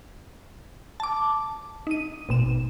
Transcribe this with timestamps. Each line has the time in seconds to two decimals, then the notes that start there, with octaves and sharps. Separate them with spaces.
1.00 A5 D6
1.87 D#4 D#7
2.29 A1 B2 E7